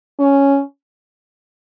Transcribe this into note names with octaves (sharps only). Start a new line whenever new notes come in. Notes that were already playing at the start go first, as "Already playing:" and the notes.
C#4